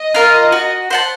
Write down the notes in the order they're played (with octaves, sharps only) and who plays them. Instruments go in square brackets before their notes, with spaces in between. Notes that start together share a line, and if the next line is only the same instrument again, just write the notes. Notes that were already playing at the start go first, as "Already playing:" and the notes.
Already playing: [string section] D#5
[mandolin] F4 A#4 F5
F#4
C5 F#5 A5